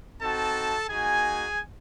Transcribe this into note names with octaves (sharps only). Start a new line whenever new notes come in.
C4 D#4 F#4 A4 A5
A#3 D#4 F#4 G#4 G#5